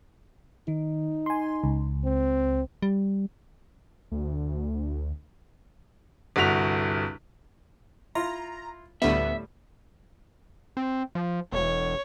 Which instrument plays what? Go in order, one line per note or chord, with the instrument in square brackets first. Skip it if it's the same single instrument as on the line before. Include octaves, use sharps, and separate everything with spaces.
[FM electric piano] D#3 [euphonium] D#4
[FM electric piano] G#5 C6
C#2
[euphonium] C4
[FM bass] G3
[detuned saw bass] D2
[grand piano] G1 C2 F#4 B6 F7
[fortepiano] E4 F4 [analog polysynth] A#5
[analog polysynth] D2 B3 [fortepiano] A2 D3 G3 [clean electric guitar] E5
[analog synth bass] C4
F3
[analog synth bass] E1 [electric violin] C#5